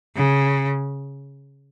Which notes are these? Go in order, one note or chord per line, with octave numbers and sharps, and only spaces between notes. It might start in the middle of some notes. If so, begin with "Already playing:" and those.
C#3